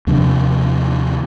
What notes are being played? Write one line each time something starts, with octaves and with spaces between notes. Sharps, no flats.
D#2 C3 F3 D4